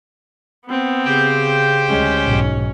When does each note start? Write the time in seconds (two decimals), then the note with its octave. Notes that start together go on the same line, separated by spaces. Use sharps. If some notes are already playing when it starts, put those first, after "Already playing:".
0.66 B3 C4
1.05 C#3 G4 C5 G5
1.89 D2 G#3 C#4
2.26 B1 G#2